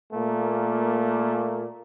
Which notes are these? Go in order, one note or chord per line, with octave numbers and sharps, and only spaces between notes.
A#2 A3 A#3